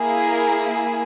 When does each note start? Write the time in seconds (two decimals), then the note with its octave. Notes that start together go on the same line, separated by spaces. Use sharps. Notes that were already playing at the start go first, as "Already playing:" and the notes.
Already playing: A#3 E4 G#4
0.27 A#4